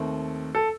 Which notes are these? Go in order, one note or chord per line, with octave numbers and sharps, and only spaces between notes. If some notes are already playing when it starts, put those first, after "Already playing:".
Already playing: D#2 D#3 A3 C4
A4